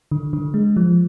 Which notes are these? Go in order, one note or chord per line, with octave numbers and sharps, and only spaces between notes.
D3
D3
G#3
F3